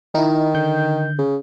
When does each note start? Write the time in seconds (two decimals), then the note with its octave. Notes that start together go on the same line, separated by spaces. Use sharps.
0.15 D#3 D#4 E4
0.54 D3 G6
1.19 C#3